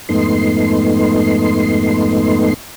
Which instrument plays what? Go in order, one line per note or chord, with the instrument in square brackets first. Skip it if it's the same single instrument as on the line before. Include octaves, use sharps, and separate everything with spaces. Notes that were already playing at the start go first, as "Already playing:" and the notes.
[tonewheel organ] F2 G#2 A3 B3 D#4 C6